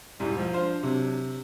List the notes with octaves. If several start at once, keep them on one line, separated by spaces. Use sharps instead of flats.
E1 G#2 G3 E4
F3 G#3
D4 F4 C5 F5
C3 F#3